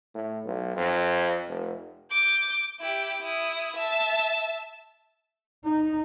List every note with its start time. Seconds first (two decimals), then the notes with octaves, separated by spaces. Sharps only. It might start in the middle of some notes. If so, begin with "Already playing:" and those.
0.15 A2
0.45 B1
0.77 F2
1.49 F1
2.10 D6 G6
2.80 E4 G4
3.22 E4 D#6
3.76 E5 A5
5.65 D#4